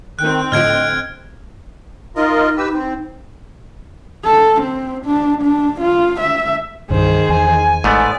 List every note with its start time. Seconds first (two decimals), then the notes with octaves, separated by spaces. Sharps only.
0.19 D#3 C4 G5 F#6
0.52 A2 D3 F3 D#5 F6 G#6 D7
2.16 D#4 F4 A#4 D#5
2.57 G4 B4 E6
2.74 C4
4.24 A4
4.62 C4
5.05 D4
5.42 D4
5.81 F4
6.21 E5
6.90 C2 G2 D#3 G#4 C5
7.29 E2 G#5
7.84 A1 G#2 A3 B3 D5